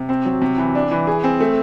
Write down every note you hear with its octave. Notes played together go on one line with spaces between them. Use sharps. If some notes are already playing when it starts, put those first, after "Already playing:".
Already playing: C3
C4
F#3
C3
E3
D4
E3
G#4
C4
A3